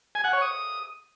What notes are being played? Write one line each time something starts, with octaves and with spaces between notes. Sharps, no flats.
G#5
F#5
C#5
D#6